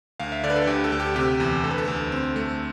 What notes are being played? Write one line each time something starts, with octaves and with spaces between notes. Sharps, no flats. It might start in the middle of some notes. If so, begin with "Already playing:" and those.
D2 F5
E5
D3 D5
B4
A4
D2 G4
A4
D2
G4
C3 G4
E2
D2 A4
B4
A4
D2
C4
A3